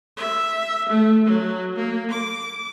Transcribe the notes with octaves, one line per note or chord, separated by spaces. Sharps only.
E5
A3
F#3
A#3
D6